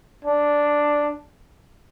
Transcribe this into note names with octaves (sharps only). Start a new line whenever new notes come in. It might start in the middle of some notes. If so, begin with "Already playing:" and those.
D4